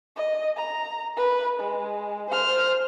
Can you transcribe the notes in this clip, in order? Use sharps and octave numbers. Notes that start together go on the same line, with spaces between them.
D#5
A#5
B4
G#3
C5 F6